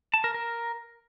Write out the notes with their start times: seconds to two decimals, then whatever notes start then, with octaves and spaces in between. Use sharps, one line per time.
0.14 A5
0.24 A#4
0.34 A#4